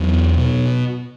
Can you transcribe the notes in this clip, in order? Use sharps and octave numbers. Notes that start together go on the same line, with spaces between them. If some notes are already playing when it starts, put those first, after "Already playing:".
Already playing: E2 F#3
B2